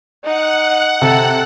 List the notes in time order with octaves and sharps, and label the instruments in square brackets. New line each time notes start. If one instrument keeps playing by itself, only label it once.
[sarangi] D#4 [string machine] F#5
[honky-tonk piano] C3 [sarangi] A4